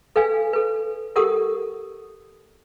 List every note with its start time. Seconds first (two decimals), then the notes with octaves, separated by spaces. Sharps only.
0.16 A4 B4 F5 G#5
0.53 A4 B4
1.16 G4 A4 A#4 F#5 D#6